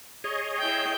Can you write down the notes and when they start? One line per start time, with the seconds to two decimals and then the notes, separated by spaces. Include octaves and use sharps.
0.24 G#4 C#5 D#5
0.59 E4 G5